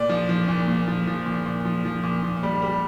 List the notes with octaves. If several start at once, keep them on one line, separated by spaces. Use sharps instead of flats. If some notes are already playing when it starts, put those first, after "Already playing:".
Already playing: A#2 D5
F3
F3
A#2
A#2
F3
F3
A#2
A#2
F3
F3
A#2
A#2
G3
G3